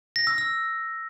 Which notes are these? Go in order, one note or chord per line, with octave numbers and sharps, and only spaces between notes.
A#6
E6
E6